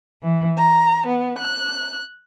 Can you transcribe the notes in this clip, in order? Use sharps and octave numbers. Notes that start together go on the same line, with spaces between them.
E3
A#5
B3
F#6